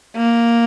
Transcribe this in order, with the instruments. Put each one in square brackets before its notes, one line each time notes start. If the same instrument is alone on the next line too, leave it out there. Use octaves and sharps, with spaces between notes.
[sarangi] A#3